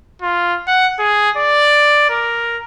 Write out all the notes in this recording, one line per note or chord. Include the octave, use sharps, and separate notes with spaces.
F4
F#5
G#4
D5
A#4